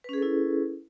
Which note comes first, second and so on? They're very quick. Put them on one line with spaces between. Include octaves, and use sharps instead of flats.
B4 C#4 G#4 A4 E4